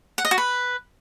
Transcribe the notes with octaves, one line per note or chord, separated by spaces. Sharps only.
F#5
D#5
F#4
B4